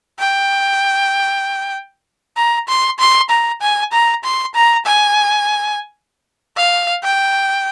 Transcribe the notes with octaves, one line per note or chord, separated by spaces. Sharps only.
G5
A#5
C6
C6
A#5
G#5
A#5
C6
A#5
G#5
F5
G5